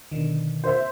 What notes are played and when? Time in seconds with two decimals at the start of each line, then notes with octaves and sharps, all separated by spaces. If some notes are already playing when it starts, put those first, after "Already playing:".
0.12 B2 D3 D#3
0.64 C5 E5